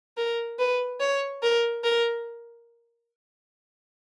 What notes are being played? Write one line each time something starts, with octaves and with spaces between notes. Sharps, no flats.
A#4
B4
C#5
A#4
A#4